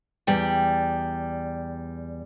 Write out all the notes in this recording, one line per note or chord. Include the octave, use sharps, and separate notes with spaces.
E2 G3 D5 G5